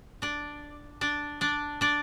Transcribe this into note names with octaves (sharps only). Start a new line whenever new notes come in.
D4 D5
D4 D5
D4 D5
D4 D5